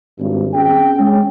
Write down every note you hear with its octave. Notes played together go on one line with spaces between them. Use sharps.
G#1 G2
C4 C#4 G#4 G5
G#3 C#4